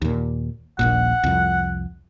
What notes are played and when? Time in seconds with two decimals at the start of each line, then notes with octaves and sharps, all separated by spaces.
0.02 D#2 A#2
0.79 D#1 A#1 A#2 F#5
1.24 C2 F2